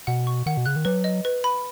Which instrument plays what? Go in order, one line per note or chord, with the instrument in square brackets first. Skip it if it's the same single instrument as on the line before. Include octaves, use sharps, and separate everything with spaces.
[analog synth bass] B2 [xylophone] F#5
[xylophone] C#6
[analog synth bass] D#3 [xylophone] F#5
[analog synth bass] B2
[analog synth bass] C#3 [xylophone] F#6
[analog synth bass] D#3
[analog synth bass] F#3 [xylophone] B4
[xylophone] D#5
B4
B5